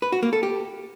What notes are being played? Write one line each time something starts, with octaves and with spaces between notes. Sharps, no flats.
B4
F#4
A#3
A4
G4